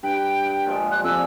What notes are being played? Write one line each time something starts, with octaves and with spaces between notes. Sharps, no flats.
G2 B4 G5
F#5
A#2 F3 G#3
F3 G3 F#6
F2 D5 G#5 E6